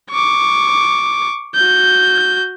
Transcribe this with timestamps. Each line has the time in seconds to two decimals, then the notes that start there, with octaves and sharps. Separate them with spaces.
0.10 C#6 D6
1.55 F#4 G6